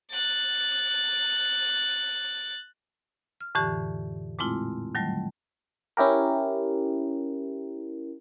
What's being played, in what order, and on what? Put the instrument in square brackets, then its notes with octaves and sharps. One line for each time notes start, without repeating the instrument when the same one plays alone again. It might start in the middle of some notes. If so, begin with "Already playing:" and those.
[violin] F#6 A6
[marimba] F6
F2 A2 D3 E3 G4
A#2 G#3 A3 C4 E4 F4
D#3 F#3 G3 A3
[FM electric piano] C#4 E4 G4 A#4